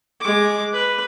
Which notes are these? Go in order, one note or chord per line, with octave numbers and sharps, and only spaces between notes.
G#3 D6
B4